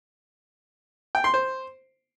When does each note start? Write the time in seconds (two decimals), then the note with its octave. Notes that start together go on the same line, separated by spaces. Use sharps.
1.15 G5
1.24 C6
1.34 C5